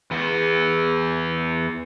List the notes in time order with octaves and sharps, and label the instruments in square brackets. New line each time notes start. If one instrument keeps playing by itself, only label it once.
[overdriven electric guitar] E2 B3